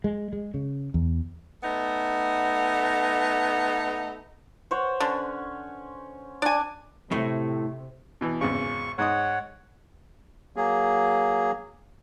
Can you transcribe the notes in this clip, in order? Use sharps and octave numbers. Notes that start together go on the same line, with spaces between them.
G#3
G#3
C#3
E2
A3 B3 D#4
C5 C#5 F#5
D3 C#4
D4 D5 G#5 D6
A2 C3 A3
B2 E3
G#1 E2 C#3 C#6
G#2 D#4 C#5 F#5 D#6
F#3 A#3 G#4